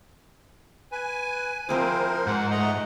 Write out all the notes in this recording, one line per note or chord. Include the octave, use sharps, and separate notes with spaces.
B4 G#5
F3 C4 E4 G#4 A#4 C5 D6
G#2 F#5
A3 D#5 F#5 A#5